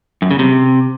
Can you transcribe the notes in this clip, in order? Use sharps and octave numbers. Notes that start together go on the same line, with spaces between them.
F#2
C#3
C3